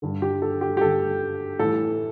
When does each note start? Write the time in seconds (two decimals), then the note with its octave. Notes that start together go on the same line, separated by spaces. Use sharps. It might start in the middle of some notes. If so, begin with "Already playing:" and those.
0.02 G2 D3
0.22 G4
0.42 A4
0.61 G4
0.77 G4
0.81 G2 D3 A4
1.59 A2 E3 A4